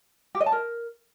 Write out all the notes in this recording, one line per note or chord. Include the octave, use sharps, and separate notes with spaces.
G4
D#5
A5
A#4